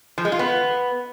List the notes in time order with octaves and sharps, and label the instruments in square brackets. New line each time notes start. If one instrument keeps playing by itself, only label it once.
[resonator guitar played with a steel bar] F3
G#3
F4
B3